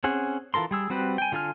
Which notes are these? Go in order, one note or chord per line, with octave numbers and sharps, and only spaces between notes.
C4 C#4 G#4 F#5
E3 F4 A4 A#4 C6
G3 G#4 E6
G3 C4 F#4 G4 B4
G5 G#5
D3 F4 A4 G#5 F6